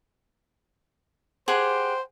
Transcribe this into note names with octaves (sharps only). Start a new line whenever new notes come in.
G4 G#4 C5 F#5